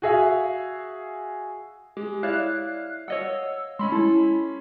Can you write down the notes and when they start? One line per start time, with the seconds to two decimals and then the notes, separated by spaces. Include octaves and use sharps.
0.02 F#4 G#4 E5 F5
1.97 G#3 G4
2.23 E4 C#5 D5 F5 F#6
3.08 C#5 D#5 F#5 E6
3.79 G#3 C#4 B5 C6
3.92 E4 A4